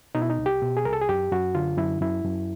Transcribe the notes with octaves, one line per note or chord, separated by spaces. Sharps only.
B2 D#4
E4
D#4
C2
G4
B2
G#4
C2 A#4
A4
G#4
F#2 G4
F#2 F#4
D3 F4
F#2 E4
F#2 E4
F#2